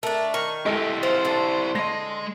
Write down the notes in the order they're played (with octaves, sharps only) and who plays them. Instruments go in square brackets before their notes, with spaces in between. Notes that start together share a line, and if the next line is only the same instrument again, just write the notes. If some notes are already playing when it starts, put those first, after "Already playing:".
[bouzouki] A3 D4 [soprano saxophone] A#4
[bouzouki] D#3 [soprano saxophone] C#6
[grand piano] G#3 [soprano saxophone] A3 [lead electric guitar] E4 G4
[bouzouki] F3 [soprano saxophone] C5
[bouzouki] D3
[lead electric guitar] G#3 D#5 [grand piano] C6 A#6